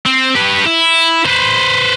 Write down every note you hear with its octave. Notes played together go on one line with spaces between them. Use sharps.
C4
G4 B4
E4
B4 C5